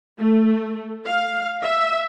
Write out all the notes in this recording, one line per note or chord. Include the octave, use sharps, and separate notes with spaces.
A3
F5
E5